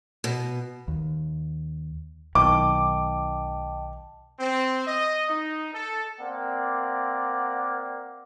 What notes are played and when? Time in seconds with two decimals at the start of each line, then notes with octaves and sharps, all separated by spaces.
0.24 B2
0.88 D#2
2.35 B1 D#3 D#5 G5 A5 D6
4.40 C4
4.87 D#5
5.28 D#4
5.73 A4
6.20 A#3 C4 D5 F#5